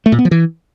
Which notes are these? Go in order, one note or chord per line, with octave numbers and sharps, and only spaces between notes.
A3
A#2
B3
F3
E3